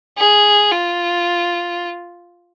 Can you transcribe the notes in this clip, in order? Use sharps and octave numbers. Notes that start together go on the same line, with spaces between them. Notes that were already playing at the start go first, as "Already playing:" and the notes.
G#4
F4